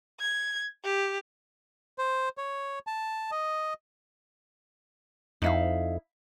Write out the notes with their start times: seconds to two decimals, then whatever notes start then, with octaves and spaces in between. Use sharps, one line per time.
0.20 G#6
0.84 G4
1.98 C5
2.38 C#5
2.87 A5
3.31 D#5
5.42 F2 D#4 E4 F5